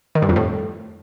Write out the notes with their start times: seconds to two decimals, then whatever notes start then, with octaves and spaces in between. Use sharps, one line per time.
0.15 D#3
0.22 G2
0.29 F2
0.36 A2